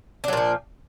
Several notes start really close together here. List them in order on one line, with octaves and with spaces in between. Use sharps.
D4 F#3 A#2 F3